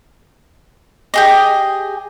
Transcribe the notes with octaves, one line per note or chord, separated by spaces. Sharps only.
G4 G#4 D#5